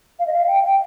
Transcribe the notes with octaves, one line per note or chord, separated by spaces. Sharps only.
F5
D#5
F5
G5
G5